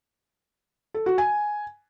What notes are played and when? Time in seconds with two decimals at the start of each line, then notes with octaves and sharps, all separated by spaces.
0.94 A4
1.06 F#4
1.18 G#5